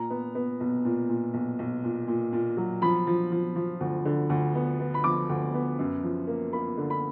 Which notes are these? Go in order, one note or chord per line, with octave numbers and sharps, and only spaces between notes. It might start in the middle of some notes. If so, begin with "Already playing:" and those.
Already playing: A#2 A#5
B3
B3
B1
A#2
A#2
B1
B1
A#2
A#2
A#2
F#3
F3 B5
F3
F3
F3
D2
D3
D2
B3
B3
B5
F3 D6
D2
B3
F#2
F3
A#3
A#3 B5
D3
B5